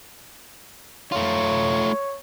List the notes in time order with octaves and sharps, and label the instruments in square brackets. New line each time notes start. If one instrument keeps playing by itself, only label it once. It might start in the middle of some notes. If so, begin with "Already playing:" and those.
[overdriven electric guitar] A3 F4 [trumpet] C#5